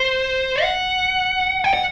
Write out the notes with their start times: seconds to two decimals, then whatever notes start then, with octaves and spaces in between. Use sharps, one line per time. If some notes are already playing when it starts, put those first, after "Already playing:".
Already playing: C5
0.62 F#5
1.64 G5
1.74 F#5